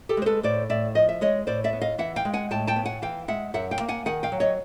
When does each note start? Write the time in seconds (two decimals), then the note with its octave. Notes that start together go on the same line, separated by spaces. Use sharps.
0.09 G4 A4
0.17 G#3 C5
0.26 A4 B4
0.43 A2 C5 D5
0.69 A2 D5 E5
0.95 F3 D#5
1.09 E5
1.21 G#3 C#5 D#5
1.47 A2 C5 D5
1.64 D5 E5
1.73 B3
1.81 D#5 F5
1.98 E3 E5 F#5
2.16 F5 G5
2.25 G#3
2.33 F#5 G#5
2.51 A2 G5 A5
2.67 G5 A5
2.76 B3
2.86 F#5 G#5
3.02 E3 F5 G5
3.28 G#3 E5 F#5
3.54 F#2 E5 F#5
3.71 F5 G5
3.80 A#3
3.89 F#5 G#5
4.06 D#3 F#5 G#5
4.23 F5 G5
4.32 F#3
4.40 C#5 D#5